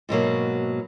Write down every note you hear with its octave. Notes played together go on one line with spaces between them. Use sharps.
G#2 B2 F#3 A#3